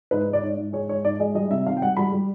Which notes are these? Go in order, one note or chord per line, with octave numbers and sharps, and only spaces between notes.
G#2 B4
G#3
D5
G#2 C#5
G#2
G#3 C#5
G#2 C#5
G#2 D5
G#3 D#5
G3 D#5
C3 E5
D#3 F5
G5
G3 F#5
G3 B5
G3